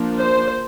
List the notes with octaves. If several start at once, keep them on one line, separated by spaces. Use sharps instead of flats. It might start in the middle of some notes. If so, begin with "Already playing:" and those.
Already playing: F3 A#3 D4
C5